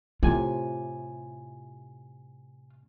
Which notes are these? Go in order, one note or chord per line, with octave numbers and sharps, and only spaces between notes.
A2 C3 F4 G#5